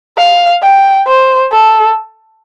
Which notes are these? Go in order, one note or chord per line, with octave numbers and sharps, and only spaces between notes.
F5
G5
C5
A4